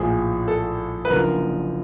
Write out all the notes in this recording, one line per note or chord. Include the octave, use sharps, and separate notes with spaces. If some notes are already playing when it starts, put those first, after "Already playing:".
Already playing: A#1 A2 F3 G#4
A4
B4
F#1 F#2 D3 F3 A#4